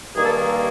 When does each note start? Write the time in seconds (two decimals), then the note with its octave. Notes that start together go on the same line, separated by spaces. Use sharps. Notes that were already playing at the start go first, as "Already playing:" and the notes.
0.16 G2 D#3 G3 A#3 G#4
0.24 A4
0.33 G#4